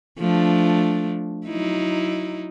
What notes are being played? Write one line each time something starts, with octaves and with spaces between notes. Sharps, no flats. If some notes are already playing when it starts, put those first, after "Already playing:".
F3 A3 D4
F#3 D#4 E4